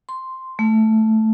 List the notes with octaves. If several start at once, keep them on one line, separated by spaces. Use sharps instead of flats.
C6
A3